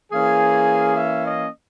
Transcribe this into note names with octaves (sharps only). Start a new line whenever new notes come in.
E3 A#3 C#4 G#4
E5
D#5